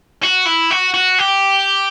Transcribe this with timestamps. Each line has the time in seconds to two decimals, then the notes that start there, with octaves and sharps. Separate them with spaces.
0.24 F#4
0.46 E4
0.71 F#4
0.94 F#4
1.19 G4